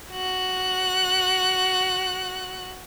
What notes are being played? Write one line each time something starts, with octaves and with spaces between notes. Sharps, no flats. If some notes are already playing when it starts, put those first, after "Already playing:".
F#4 F#6